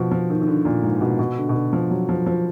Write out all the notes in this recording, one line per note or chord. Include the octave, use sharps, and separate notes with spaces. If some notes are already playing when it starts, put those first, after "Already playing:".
Already playing: B2 F3
F3
D#3
D#3
D3
A#2
G#2
B2
B2
D3
B2
D3
F3
F#3
F3
F3